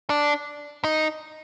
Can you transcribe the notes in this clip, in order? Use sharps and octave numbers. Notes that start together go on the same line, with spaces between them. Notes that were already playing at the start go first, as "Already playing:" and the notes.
D4
D#4